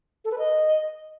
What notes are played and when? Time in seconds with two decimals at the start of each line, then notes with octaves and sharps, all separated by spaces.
0.25 A4
0.31 B4
0.38 D#5